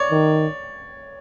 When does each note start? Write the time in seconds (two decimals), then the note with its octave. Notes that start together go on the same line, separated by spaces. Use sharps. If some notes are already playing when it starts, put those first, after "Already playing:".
Already playing: C#5 D5
0.11 D#3